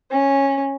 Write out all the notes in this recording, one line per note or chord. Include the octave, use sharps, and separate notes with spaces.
C#4